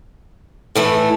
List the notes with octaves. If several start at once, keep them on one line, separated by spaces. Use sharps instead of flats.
A2 E3 A3